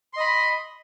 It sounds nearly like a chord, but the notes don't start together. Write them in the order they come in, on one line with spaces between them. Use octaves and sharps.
C6 D#5 B5